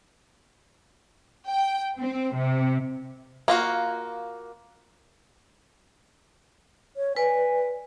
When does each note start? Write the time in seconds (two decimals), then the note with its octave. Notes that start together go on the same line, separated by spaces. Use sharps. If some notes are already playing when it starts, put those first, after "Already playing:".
1.47 G5
1.98 C4
2.35 C3
3.48 A#3 F4 F#4
6.97 C#5
7.16 B4 D5 G#5